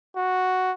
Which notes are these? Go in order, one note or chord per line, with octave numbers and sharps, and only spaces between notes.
F#4